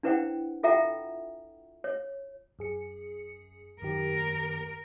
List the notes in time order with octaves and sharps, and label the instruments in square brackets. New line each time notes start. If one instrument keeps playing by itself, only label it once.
[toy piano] D4 E4 B4 C5 F#5 G5
F4 A4 E5 F#5 G5 A#5
C#5
[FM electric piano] F#2 G#4 C#7
[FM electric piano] F#2 D#3 G4 [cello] A#4